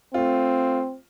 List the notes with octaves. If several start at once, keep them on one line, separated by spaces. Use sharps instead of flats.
A3 C4 F4